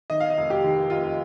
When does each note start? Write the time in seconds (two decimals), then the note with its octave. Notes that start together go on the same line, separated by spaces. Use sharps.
0.10 D#3 D#5
0.20 F5
0.30 D#5
0.37 F1
0.50 G4
0.64 D#2
0.90 F1 F4